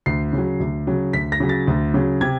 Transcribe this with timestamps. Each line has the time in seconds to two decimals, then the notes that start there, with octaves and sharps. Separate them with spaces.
0.06 D2 C7
0.33 C#3
0.38 F#3
0.60 D2
0.87 C#3 F#3
1.13 D2 B6
1.32 A#6
1.40 C#3 F#3
1.49 A6
1.67 D2
1.94 C#3 F#3
2.21 C3 G#6